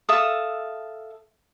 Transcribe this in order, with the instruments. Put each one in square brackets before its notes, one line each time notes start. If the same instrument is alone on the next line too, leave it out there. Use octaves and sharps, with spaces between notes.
[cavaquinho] A4 E5 F5 D#6